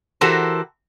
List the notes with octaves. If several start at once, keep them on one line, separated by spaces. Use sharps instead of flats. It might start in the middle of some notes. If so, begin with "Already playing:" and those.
E3 F#4 G4 A4 A#4 C5